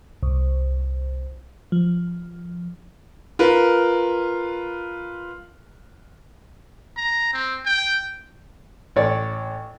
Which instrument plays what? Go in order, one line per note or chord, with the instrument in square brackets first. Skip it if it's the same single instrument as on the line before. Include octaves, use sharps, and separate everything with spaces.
[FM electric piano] C2
F3
[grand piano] F4 A#4 B4
[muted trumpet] A#5
C4
G5
[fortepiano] A1 C#5 D5